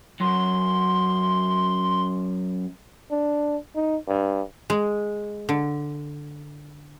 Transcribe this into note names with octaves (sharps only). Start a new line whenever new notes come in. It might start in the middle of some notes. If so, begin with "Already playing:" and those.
F#2 C6
D4
D#4
G2
G#3
D3